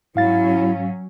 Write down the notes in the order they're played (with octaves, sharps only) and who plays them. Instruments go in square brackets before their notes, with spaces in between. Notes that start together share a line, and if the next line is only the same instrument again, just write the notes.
[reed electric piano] G#2 F5 A6 [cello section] F#3 C#4 [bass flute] E4